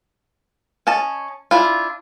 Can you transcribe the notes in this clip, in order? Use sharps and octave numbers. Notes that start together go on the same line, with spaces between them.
C#4 D#5 A5
D4 E4 F4